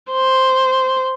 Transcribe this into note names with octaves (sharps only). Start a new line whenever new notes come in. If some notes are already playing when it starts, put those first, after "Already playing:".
C5